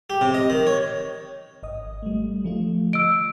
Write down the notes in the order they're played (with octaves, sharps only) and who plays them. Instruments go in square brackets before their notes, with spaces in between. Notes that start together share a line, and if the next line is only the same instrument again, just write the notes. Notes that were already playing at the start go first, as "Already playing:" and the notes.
[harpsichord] G4
C3
D#5
D#3
C#5
[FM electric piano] G#1 D#5 D#6
G3 A3
F3 A3 F4
[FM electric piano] D#5 [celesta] E6 D7